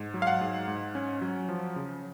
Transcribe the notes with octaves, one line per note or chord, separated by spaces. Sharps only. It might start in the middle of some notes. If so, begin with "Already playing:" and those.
Already playing: G#2
F#3
F5
F#5
G#2
G#2
C#4
F#3
F3
C#3